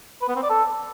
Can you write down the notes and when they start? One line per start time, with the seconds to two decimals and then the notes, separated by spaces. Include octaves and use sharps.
0.22 B4
0.29 B3
0.36 C4
0.43 D5
0.50 A4